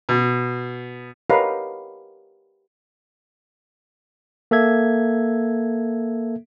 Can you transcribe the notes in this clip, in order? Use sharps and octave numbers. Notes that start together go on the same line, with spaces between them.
B2
G4 A#4 B4 C#5 D#5 F5
A#3 A4 E5 G#6